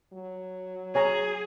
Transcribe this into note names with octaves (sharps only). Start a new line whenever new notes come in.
F#3
G#4 C#5 G#5 A#5